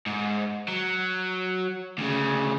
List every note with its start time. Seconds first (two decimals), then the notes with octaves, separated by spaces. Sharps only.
0.07 G#2
0.68 F#3
1.98 D2 C#3